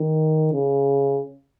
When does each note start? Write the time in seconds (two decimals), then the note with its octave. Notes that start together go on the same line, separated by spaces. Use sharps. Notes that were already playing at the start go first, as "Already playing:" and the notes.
Already playing: D#3
0.53 C#3